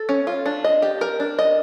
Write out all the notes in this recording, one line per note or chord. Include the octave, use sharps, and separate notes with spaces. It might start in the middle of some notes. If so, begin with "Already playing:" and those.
Already playing: A4
C#4
F4
D4
D#5
G4
A#4
D4
D#5